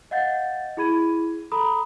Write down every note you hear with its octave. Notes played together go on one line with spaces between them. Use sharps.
D#5 F5 F#5 G6 A6
E4 G#4 B5 G#6 D#7
A4 A#5 B5 D#6